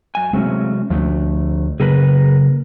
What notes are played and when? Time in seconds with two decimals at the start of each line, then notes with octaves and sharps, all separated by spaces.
0.15 F#2 G#5
0.33 C3 F#3 G#3 A3 C4 C#4
0.90 D2 F3 A3
1.80 C#3 F#3 A#3 G#4 A#4 B4